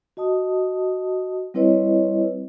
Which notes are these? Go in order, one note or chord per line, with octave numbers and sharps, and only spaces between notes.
F#4 D#5 A5 D#6
G3 C4 E4 B4 C#5 D#5